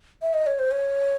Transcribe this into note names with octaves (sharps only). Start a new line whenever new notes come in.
E5
D#5
C#5
C5
C#5